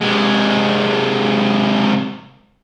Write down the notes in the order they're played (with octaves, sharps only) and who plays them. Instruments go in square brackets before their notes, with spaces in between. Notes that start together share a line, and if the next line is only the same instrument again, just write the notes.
[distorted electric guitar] C3 G#3